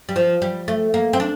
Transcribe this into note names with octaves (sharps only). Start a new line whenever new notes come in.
G3
F3
G3
A3
A#3
C4
D4